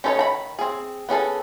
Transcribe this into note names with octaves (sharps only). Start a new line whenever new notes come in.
C#4 D#4 A4 C5 C#5
D#3 A#5 B5
C4 G#4
B3 C#4 G#4 A4